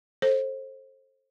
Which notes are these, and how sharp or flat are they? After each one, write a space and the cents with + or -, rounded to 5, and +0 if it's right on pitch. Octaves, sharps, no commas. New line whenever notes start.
A4 -5 C5 +25